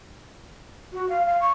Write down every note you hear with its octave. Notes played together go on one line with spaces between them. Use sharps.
F#4
F5
F5
C#6